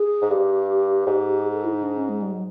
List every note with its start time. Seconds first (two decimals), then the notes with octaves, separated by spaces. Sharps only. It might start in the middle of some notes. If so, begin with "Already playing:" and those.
Already playing: G#4
0.21 G#2
0.30 G2 G4
1.07 G#2
1.45 G#4
1.54 A4
1.64 E4
1.74 D#4
1.83 D4
1.97 C#4
2.09 G#3
2.22 G3
2.32 F#3